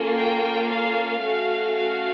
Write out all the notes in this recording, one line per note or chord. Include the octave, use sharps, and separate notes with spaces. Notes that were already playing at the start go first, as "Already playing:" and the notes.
Already playing: A#3 C#4 F4 A4
G5
F5
A3 C#4 F#4 A4
F5